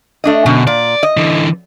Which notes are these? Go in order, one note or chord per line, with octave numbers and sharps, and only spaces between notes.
A3 D4 D#5
F#2 B2 D3
A#2 D5
D#5
D3 E3